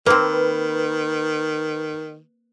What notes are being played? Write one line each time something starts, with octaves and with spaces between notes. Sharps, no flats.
D#3 A#3 C4 B4